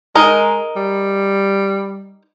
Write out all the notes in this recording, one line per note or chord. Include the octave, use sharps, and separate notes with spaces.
G#3 D#4 A#4
G3